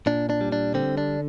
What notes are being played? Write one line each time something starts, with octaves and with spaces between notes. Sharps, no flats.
A#2 D4
D4
G3
D4
D3 C4
D4